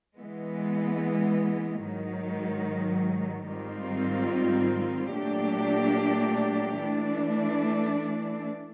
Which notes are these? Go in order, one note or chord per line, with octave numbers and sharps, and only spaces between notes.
E3 G#3 B3
G#2 D#3 F#3
G#2 D#3 G3 C4 F4
A#2 F#3 A3 D4 G4
E3 A3 D4